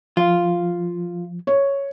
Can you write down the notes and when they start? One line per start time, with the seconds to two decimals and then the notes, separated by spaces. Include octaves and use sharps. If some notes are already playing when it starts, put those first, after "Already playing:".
0.17 F3 F4
1.47 C#5